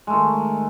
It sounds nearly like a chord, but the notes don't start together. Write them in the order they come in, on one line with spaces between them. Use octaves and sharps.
G#3 A3 D#3